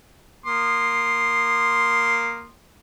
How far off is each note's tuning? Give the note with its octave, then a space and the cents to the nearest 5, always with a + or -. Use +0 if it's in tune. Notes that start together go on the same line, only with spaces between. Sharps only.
A#3 +0 C6 +0 D#6 -25